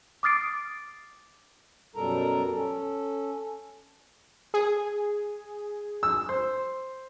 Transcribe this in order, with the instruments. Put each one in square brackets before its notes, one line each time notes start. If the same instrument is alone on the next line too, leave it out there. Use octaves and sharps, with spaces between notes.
[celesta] D6 D#6 F6 A6 C7 D7
[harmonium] F#2 B2 G3 A4 A#4 A#5
C#4 A4
[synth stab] G#4
[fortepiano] E6
C5